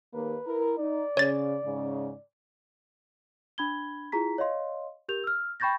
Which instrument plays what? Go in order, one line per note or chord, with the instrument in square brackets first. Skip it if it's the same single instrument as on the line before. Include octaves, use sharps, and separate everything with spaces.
[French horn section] D#2 A#3 [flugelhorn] B4
[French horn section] E4 A#4
[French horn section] D#4 [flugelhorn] D5
[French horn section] C#3 [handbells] C#5 A6
[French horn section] G#2 C#3
[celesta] D4 B5 G#6 G7
E4 F4 G#4 A#5 B6
C#5 D#5 F5 C6
G4 A#4 G6 F7
E6 F6
G5 B5 C#6 G6 A6 A#6